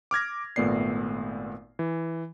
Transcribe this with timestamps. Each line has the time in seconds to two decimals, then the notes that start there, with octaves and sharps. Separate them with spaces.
0.11 D6 F6 G#6 A#6
0.56 G#1 A#2 A3 B3 D5 C7
1.79 E3